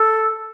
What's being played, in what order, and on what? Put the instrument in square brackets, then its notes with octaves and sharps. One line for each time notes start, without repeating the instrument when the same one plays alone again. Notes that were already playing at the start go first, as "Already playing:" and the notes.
Already playing: [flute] A4